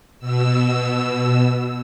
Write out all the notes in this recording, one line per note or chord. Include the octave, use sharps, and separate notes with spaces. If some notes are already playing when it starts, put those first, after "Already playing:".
B2 E6